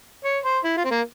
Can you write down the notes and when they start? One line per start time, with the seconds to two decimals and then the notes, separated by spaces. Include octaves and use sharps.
0.24 C#5
0.44 C5
0.64 E4
0.77 F4
0.84 C4
0.91 A#3